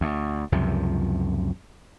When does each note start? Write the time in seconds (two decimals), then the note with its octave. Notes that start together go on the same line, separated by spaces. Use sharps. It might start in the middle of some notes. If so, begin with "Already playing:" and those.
0.01 D2
0.52 C#2 F#2 C3 F3